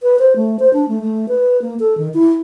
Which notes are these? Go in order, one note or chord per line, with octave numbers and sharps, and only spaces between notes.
B4
C5
A3
C5
D4
A3
A3
B4
A#3
A4
D#3
E4